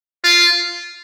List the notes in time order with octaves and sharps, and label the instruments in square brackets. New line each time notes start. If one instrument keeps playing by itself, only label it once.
[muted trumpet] F4